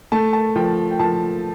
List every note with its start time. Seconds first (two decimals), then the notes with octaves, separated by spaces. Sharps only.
0.12 A3 A5
0.33 A5
0.56 F3 G5
0.91 G5
0.99 F3 A5